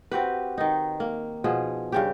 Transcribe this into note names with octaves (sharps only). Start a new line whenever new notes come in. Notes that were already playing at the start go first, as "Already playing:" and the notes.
C4 F#4 G4 B4
D#3 D#4
A#3
B2 F3 G#4
G2 C#3 G4